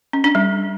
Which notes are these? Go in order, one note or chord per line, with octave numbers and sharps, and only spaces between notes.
C#4
D4
G3